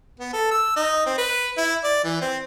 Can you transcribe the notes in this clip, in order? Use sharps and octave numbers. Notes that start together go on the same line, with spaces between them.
B3
A4
E6
D#4
C4
B4
E4
D5
E3
C4